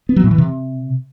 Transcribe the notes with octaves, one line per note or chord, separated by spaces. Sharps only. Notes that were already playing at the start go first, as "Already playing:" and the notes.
B3
F#3
A2
E3
C3